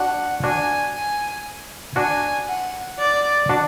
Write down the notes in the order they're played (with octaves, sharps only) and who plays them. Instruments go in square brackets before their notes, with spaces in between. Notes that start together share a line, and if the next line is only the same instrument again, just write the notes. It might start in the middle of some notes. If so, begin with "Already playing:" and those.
Already playing: [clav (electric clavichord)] D4 F#4 [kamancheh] F#5
[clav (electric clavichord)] D4 F#4 [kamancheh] G#5
[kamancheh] G#5
[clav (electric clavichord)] D4 F#4 [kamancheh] G#5
[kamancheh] F#5
D5
[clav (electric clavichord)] D4 F#4